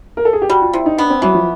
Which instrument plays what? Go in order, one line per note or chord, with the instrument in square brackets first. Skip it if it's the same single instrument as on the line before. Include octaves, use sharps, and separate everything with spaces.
[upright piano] A#4
A4
G#4
G4
[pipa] G3 [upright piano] F#4
[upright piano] F4
[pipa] C3 [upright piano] E4
[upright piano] D#4
[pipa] B3 [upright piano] D4
[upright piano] C4
[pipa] E3 [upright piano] F#3
[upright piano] F3